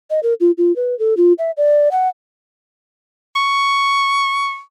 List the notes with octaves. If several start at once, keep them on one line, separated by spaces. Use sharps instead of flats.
D#5
A#4
F4
F4
B4
A4
F4
E5
D5
F#5
C#6